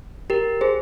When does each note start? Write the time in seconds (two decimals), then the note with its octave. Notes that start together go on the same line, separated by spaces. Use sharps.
0.30 G4 A#4
0.61 G#4 C5